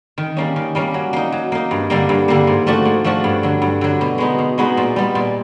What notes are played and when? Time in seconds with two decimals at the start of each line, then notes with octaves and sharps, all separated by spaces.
0.18 D#3
0.37 G3 A#3 C#4
0.56 D#3
0.75 G3 A#3 C#4
0.94 F#3
1.13 A#3 D#4
1.32 F#3
1.52 A#3 D#4
1.71 G2
1.90 D3 G3 A#3
2.09 G2
2.28 D3 G3 A#3
2.47 G#2
2.66 F3 A3 D4 F#4
2.85 G#2
3.04 F3 A3 D4 F#4
3.24 G2
3.43 D3 F#3
3.62 G2
3.81 D3 F#3
4.01 B2
4.18 G#3 B3 D#4 F#4
4.38 B2
4.58 G#3 B3 D#4 F#4
4.77 A#2
4.96 G3 B3
5.15 A#2